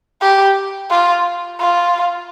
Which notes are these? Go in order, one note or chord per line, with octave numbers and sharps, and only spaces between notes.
G4
F4
F4